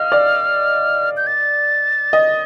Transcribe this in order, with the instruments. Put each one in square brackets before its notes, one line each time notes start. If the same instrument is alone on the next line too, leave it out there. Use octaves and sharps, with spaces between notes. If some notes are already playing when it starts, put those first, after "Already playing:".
Already playing: [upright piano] D#5 F5 [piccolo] F6
[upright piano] D5
[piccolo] G6
A6
[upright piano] D#5